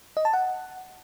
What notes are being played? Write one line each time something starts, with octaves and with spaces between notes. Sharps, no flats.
D#5
A5
F#5